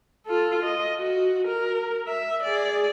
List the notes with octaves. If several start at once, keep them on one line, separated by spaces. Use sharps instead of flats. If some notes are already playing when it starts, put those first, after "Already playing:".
F4 A4
D#5
F#4
A#4
E5
G#4 D5